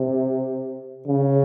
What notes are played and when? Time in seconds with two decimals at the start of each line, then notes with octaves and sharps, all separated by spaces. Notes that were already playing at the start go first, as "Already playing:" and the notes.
Already playing: C3
1.07 C#3